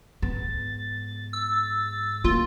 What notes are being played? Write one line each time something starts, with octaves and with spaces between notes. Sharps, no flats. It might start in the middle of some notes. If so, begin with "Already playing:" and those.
G#2 B3 A6
E6
A3 A#3 F4